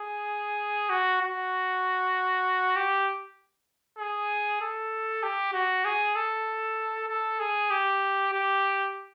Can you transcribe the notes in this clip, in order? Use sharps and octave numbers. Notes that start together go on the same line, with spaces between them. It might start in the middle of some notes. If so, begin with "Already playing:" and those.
Already playing: G#4
F#4
F#4
G4
G#4
A4
G4
F#4
G#4
A4
A4
G#4
G4
G4